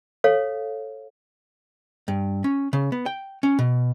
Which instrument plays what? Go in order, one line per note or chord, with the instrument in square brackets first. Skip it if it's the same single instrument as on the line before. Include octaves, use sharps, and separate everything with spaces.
[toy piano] A4 C#5 F5
[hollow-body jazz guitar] G2
C#4
C#3
B3
G5
C#4
B2